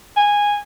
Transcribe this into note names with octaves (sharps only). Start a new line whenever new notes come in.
G#5